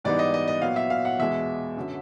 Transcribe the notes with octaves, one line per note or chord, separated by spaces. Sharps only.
G#2 E3 G3 B3 D#4 D5
D#5
D#5
D#5
A#2 F#3 B3 F5
E5
F5
F#5
E2 B2 G#3 E5
F#2 D3 F#3